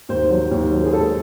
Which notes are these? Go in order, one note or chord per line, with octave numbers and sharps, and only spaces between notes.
D#2 C5
F#3
D#2
F#3
G#4
G#3 A4